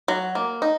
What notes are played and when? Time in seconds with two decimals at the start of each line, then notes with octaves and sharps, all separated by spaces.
0.08 F#3
0.35 A#3
0.62 D#4